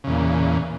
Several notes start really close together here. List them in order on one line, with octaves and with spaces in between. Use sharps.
C#3 E2 A#2